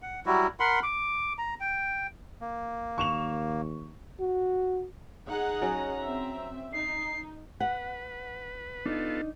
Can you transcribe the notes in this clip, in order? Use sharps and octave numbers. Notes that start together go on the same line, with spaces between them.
F#5
F#3 G3 E4 F#4
A#4 F#5 B5 C6
D6
A#5
G5
A#3
D#2 C#6 E7 F7
F#4
D#4 G#4 F#5 A#5
F#3 C#4 F#4
C4 E5
D#4 C7
B4 F#5
B3 D4 D#4 F4 A4